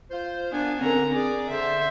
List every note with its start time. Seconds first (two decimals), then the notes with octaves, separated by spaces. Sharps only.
0.11 F4 C5
0.52 A#3 B3 D4 G#5
0.81 G#2 D3 C4 C#4 A#4 F#5 A#5
1.13 G#4 D5
1.50 D3 C5 E5